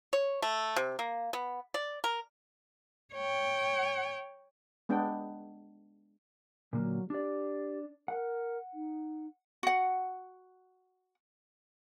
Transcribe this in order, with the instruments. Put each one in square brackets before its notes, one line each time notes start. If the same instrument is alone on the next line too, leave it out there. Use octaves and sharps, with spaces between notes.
[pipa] C#5
A3
C3
A#3
B3
D5
A#4
[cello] C#5 G5
[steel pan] G#3 B3 D4 G5
[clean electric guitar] A#2 D3 A#3 [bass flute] F#3
[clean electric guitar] D4 D5 [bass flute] G4
[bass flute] A#4 [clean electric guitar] F#5
[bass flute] D#4
[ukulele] F#4 F#5